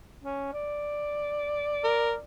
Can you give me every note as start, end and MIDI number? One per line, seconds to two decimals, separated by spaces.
0.24 0.48 61
0.53 2.23 74
1.84 2.14 70